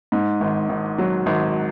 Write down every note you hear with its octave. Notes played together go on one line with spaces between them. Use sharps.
G#2
G#1
G#1
F#3
G#1